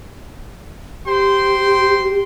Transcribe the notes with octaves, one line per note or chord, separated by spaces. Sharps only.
G4 C5 G5 C6